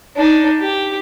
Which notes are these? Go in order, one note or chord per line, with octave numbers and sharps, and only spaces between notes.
D4 D#4
G4